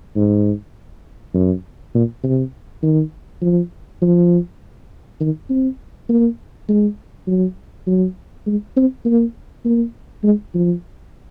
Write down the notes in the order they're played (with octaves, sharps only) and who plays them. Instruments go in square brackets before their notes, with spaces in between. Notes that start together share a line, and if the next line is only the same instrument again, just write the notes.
[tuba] G#2
F#2
A#2
C3
D#3
F3
F3
D#3
C4
A#3
G#3
F#3
F#3
G#3
C4
A#3
A#3
G#3
F3